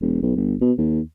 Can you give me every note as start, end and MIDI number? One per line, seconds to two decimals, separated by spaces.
0.01 0.18 28
0.22 0.35 35
0.36 0.55 31
0.61 0.72 47
0.78 1.00 39